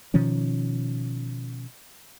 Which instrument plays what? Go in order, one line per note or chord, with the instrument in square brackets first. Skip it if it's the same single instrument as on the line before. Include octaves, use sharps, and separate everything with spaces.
[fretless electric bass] B2 D#3 F3 C#4